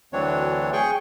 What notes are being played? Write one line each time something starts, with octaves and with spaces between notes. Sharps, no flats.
D2 E3 F#3 C4 D4 C#5
G#4 G5 C#6